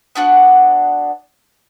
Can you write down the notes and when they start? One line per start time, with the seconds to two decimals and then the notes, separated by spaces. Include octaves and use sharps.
0.15 B3 D4 F#4 F#5